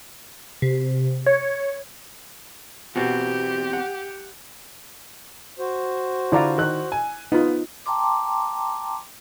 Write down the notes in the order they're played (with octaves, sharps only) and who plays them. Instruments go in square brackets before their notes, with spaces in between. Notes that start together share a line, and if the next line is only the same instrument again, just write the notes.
[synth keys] C3
C#5
[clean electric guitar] E2 C4 [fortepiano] B2 F#4 [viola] G4
[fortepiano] F#5
[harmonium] F#4 C5
[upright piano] D3 F4 [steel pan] E4 D5 A#5
[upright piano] D#3 F#6
G#5
[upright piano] B3 [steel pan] D#4 F4
[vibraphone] G5 A5 A#5 C6 D6